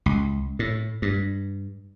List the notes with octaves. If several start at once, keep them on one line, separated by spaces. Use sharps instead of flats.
C#2
A2
G2